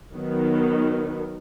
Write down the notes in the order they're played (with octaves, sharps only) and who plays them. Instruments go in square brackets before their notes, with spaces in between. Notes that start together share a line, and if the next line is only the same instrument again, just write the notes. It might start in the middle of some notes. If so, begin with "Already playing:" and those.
[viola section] D#3 F#3 B3